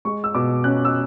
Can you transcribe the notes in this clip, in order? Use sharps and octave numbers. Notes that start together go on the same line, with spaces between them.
G#3 C#6
E6
B2 D6
C#4 F#6
E6